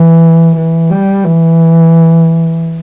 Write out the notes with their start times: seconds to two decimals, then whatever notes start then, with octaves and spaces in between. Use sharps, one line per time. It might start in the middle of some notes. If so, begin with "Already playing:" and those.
Already playing: E3
0.57 E3
0.90 G3
1.25 E3